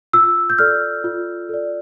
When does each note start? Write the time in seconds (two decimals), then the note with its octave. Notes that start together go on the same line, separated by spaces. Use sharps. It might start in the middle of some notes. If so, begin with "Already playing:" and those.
0.13 F4 E6
0.50 G6
0.58 A4 D5 F6
1.04 F4
1.49 A4 D5